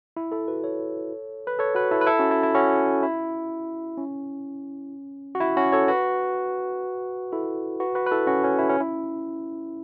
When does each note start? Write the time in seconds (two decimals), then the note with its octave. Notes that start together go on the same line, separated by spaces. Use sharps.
0.17 E4
0.32 E4 A4
0.48 F#4 B4
0.64 A4 C#5
1.47 B4
1.59 A4 C#5
1.75 F#4 B4
1.91 E4 A4
2.01 B4
2.07 E4 A4
2.19 C#4 F#4
2.31 E4
2.43 E4
2.54 C#4 F#4
3.03 E4
3.98 C#4
5.35 F#4
5.41 E4
5.57 C#4 F#4
5.72 A4 C#5
5.88 F#4 B4
7.32 E4 A4
7.80 F#4 B4
7.95 F#4 B4
8.07 B4
8.11 E4 A4
8.27 C#4 F#4
8.44 C#4
8.59 E4
8.69 C#4
8.80 E4